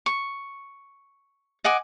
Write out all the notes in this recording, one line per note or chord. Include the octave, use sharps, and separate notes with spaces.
C#6
D#5 F#5 G#5 D6